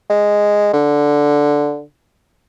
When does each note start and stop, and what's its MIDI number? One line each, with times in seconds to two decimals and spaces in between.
0.10 0.71 56
0.73 1.82 50